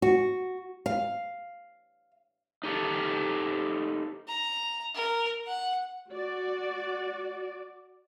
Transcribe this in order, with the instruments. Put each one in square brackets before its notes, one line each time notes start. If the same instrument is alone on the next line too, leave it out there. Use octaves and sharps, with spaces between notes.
[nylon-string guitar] F#4
F5
[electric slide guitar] D#4 G4 A4
[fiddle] A#5
A#4
F#5
[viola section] F#4 D5